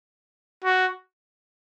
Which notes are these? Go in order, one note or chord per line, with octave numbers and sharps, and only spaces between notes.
F#4